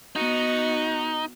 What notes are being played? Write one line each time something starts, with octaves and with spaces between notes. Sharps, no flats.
B3 D#4 F#4